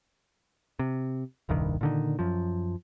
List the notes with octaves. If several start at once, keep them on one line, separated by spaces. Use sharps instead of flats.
C3
D#1 C2 G2 D#3
A#2 D3 D#3
F#2 F3